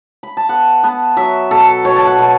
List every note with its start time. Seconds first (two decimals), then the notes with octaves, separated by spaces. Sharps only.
0.23 B5
0.37 A5
0.49 B3 F#5
0.83 B3 A5
1.17 F#3 E5
1.51 B2 A4
1.85 B2 C#5
1.96 A5
2.07 F#5
2.18 B2